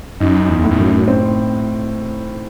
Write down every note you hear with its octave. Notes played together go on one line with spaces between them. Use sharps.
F#2 D#4
E2
A2
E2
F#2
C4